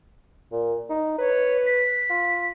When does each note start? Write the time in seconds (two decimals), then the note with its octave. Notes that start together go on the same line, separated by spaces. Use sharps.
0.52 A#2
0.90 D#4
1.18 B4 C#5
1.66 B6
2.10 F4